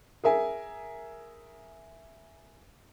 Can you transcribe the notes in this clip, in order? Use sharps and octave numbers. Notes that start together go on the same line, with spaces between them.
G#4 A#4 E5 G#5